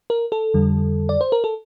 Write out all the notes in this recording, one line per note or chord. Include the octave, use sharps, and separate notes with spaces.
A#4
A4
F2 D3 G3
D5
C5
A#4
A4